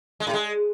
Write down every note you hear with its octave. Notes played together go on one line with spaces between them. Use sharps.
G#3
A2
G#3